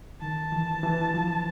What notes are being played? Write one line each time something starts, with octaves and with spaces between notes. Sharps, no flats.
D#3 A5
E3
E3
F3